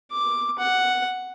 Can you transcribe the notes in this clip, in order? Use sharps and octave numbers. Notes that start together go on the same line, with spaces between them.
D6
F#5